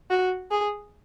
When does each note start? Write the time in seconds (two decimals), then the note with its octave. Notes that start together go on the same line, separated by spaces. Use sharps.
0.10 F#4
0.51 G#4